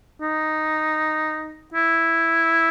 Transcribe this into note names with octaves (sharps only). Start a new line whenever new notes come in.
D#4
E4